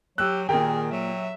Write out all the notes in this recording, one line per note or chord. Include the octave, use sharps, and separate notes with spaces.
F#3 G4 E6 F#6
A#2 D#3 G#4 A#4 G5
F#3 E5